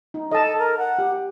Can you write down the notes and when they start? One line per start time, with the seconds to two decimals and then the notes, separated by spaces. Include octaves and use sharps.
0.14 D#4
0.31 A4 D#5 A5
0.59 A#4
0.78 F#5
0.98 G4